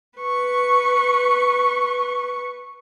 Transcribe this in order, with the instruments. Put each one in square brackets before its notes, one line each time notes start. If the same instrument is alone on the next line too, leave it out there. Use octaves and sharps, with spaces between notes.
[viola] B4 C#6